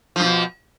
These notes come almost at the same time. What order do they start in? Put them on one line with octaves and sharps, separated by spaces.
F3 G2 B2